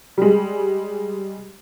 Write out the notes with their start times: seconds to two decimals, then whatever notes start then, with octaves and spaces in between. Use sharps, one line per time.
0.18 G3 G#3